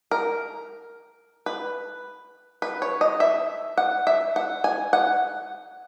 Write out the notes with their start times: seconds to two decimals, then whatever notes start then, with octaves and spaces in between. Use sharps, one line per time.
0.11 A#4
1.46 B4
2.62 B4
2.82 C#5
3.01 D#5
3.20 E5
3.77 F#5
4.07 E5
4.36 F#5
4.64 G#5
4.93 F#5